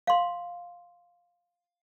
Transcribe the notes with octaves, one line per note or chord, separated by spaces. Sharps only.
F5 C6